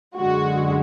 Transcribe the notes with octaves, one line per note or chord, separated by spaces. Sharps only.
F#2 D3 G#3 F#4